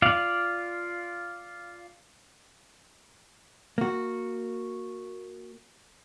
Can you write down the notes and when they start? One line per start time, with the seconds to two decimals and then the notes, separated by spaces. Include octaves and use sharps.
0.02 F4 D5 F5
3.78 A#3 F#4